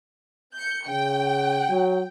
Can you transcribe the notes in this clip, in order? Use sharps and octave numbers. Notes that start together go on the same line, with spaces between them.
G6 C#7
C#3 G5
F#3